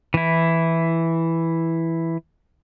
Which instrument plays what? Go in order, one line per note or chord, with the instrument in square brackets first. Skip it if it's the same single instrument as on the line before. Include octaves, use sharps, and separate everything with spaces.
[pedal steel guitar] E3 E4